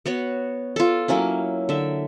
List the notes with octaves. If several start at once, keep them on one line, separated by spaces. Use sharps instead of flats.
B3 F#4 C#5
F4 A4
F#3 A#3 C#4 E4
D3 E5